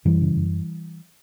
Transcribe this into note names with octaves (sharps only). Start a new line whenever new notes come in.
F#2 E3 G3
C#3
F#2